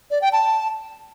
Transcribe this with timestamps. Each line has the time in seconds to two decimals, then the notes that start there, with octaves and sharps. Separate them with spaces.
0.11 D5
0.22 G5
0.33 A5